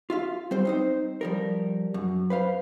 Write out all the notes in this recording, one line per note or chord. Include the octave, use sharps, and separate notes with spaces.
F4 E5 F5
G3 C4 C5
C4 D#4 C5
F3 G3 A#4
F#2
B4 C5 F5